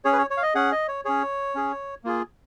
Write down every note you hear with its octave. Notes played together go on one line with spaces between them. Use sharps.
C#4 G#4 C#5
B4
C#5
C#5
F5
D#5
C#4 G#4 F#5
D#5
C#5
C#4 G#4 C#5
C#4 G#4
A#3 F4 G#4